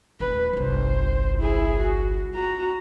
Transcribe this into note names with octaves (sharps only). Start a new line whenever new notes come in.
D#1 A3 B4
G1 C2 C5
E4 G#4
F#4
F#4 A#5